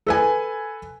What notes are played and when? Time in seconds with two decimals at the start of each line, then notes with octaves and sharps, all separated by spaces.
0.07 A4 B4 G#5